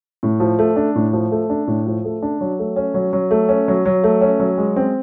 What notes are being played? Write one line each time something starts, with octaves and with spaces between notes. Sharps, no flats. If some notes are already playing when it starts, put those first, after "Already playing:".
A2
F3
A3
D4
A2
F3
A3
D4
A2
F3
A3
D4
F#3
A3
C#4
F#3
F#3
A3
C#4
F#3
F#3
A3
C#4
F#3
G#3
C4